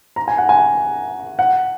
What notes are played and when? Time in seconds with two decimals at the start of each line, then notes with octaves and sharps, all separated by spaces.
0.16 A#5
0.28 G#5
0.38 F#5
0.49 G#5
1.39 F#5